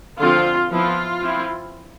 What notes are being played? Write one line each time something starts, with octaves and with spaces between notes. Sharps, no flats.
D3 F3 C4 F4
F3 B3 E4 F4
F3 C4 E4